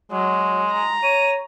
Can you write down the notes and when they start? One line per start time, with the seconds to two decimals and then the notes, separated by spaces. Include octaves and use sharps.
0.12 F#3 G#3
0.71 A#5
1.03 C#5 D#7